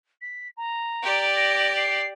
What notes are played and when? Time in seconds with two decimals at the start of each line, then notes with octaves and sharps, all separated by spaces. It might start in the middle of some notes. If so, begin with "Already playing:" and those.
0.21 B6
0.57 A#5
1.03 G4 D5
1.35 A#6
1.76 C7